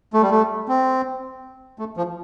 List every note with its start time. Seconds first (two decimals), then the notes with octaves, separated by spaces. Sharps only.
0.13 A3
0.22 G3
0.31 A3
0.68 C4
1.79 A3
1.97 F3